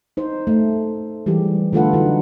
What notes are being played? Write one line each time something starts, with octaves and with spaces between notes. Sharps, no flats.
D#4 C5
A3
E3 G3 G#3 G4
D3 A3 F4 A4 B4 F#5
D3 F#3 D#4